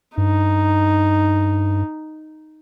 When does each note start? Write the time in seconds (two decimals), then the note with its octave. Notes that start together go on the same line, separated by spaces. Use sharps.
0.18 G2 D#4